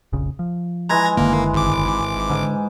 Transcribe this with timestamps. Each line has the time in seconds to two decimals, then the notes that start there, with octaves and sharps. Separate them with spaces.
0.13 F1 A#1 C#3
0.39 F3
0.89 E3 G#3 A#5 G#6 A#6
1.17 F#1 D3 D#3 A#3
1.54 G#1 D6
2.30 G#2 D3